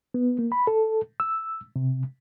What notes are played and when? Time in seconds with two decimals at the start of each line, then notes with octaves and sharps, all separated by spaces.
0.14 B3
0.39 A#3
0.52 B5
0.67 A4
1.20 E6
1.76 C3